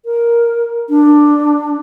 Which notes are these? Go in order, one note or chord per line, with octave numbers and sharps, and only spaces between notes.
A#4
D4